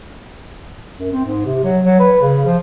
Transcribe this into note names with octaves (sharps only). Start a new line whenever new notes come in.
F#2
C4
G#2
C3
F#3
F#3
B4
C#3
F3